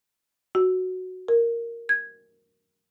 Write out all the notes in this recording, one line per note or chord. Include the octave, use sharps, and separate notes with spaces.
F#4
A#4
G#6